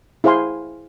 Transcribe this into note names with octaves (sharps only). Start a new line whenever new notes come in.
E4 G#4 C5 F5 G#5 C6